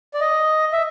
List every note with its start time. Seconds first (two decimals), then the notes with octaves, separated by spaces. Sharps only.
0.14 D5
0.21 D#5
0.73 E5